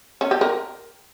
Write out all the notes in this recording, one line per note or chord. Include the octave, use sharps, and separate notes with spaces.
C#4
G4
A#4